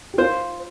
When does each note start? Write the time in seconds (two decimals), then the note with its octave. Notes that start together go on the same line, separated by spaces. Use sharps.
0.14 G4
0.18 F4 C5